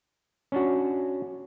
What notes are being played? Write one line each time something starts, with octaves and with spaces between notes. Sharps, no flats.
C#4 D4 F#4